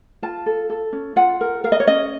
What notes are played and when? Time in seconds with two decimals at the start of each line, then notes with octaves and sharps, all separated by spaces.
0.22 F4 A5
0.46 A4
0.70 A4
0.93 C#4
1.16 F4 F#5
1.41 A#4
1.64 A#4 F5
1.72 D#5
1.80 C#5
1.87 C#4 D#5